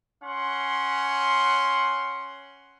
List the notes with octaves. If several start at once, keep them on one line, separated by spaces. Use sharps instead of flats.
C#4 F#5 C6